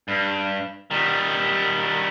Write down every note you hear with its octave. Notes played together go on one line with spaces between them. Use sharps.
G2
D#3 G3